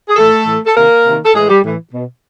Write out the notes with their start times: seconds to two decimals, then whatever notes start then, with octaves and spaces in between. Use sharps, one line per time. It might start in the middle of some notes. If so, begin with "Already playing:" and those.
0.09 G#4
0.16 A2 E3 A3 A4
0.46 A2 E3
0.66 A4
0.75 C3 D#3 A#3 A#4
1.04 C3 D#3
1.24 A4
1.34 A2 E3 G#3 G#4
1.48 G3 G4
1.63 A2 E3
1.93 B2